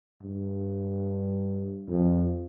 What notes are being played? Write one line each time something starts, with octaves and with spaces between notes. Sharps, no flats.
G2
F2